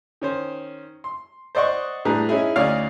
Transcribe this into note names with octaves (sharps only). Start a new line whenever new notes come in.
D#3 C#4 C5
C6
C5 D5 D#5 F#5 C#6
A2 G3 D4 G#4 B4 A#5
C#4 D#4 E4 G#4
D2 C#4 D#4 C#5 D5 F5